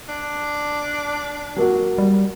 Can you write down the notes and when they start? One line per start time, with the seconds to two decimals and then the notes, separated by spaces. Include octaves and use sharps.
0.09 D4
1.56 F#3 A#3 F#4
1.98 G3